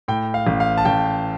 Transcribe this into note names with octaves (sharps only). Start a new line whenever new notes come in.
A2 G5
F5
A1
F5
A5
A1 G5